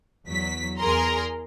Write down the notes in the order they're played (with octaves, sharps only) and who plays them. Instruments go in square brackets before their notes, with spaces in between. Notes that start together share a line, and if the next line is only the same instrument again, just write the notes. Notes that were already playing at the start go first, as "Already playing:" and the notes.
[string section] E2 F#3 B6
E2 G#4 A#4 A#5 C6